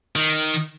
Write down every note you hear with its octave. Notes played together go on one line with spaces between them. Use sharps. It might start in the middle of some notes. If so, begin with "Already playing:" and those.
D#3